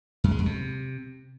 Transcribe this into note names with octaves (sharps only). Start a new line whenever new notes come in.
F#2
G#3
F2
C3